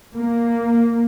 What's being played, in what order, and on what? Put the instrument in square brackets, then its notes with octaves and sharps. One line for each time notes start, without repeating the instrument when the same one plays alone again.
[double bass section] A#3